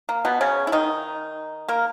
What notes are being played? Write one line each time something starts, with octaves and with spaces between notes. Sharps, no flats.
A#3
B2 B3
C#3 C#4
E4
D#3 D#4
A#3 A#4